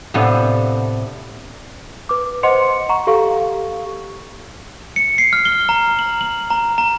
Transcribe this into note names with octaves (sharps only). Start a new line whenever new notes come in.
A2 C3 B3 D4 A4 F5
B4 D6
C5 D#5 F#5 C6 C#7
F#5 A#5 C#6
G4 A4 F5 C#6
C#7
C7
F6
G7
A#5
F#7
F#7
A#5
A#5